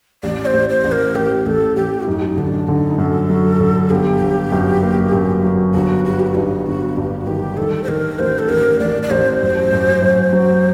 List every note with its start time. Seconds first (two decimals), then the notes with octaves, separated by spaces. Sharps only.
0.23 A1 D5
0.46 C5
0.54 A1
0.69 C5
0.84 A1
0.92 A#4
1.15 A1 G4
1.46 A1 A4
1.76 A1 G4
2.07 F#2 D#4
2.37 D3 D4
2.67 D3 D#4
2.98 F#2 A4
3.29 F#3
3.60 D3
3.90 G1 G4
4.21 G1
4.52 F#2
4.82 A#3
5.13 F#2
5.43 F#3
5.74 G1 F#4
6.05 G3 F#4
6.20 G4
6.27 F#4
6.35 G2 D#4
6.66 G1 F#4
6.96 G2 G4
7.21 F#4
7.27 D#3 G4
7.57 D#3 A4
7.84 C5
7.88 D#3 A#4
8.19 A1 C5
8.39 A4
8.49 A1 A#4
8.79 A1 D5
9.03 D5
9.10 A1 C5
9.42 F#2
9.73 F#2
10.02 F#2
10.33 F#3